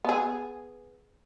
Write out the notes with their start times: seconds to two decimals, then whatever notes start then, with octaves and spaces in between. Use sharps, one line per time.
0.04 B3 G#4